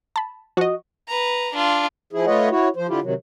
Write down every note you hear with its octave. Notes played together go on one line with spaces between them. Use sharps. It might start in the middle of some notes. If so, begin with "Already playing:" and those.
A5 B5
F3 F#4 D#5 C#6
B4 A#5
D4 F4
F3 E4 G#4
A3 F4 B4 C#5 D#5 F#5
E4 F#4 C#5
F3 C5
D3 E4 F4 G4
C3 D#3 F#3